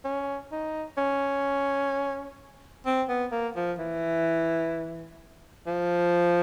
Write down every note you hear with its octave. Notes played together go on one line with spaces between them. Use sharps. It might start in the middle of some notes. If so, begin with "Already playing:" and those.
C#4
D#4
C#4
C4
B3
A#3
F3
E3
F3